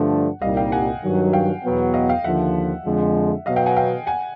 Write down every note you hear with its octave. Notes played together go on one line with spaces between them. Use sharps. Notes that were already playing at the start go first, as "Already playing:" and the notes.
Already playing: G2 D3 F3 A3 D4 F#5
C2 A#2 G3 A#3 D#4 D#5 F5
F5 G5
F#5 G#5
G2 D#3 F#3
F5 G5
E2 B2 F#3 B3
D#5 F5
F5 G5
D#2 D3 F3 E5 F#5
F2 D3 F3 G#3
B2 F#3 B3 D#5 F5
F5 G5
F#5 G#5
F5 G5
F#5 G#5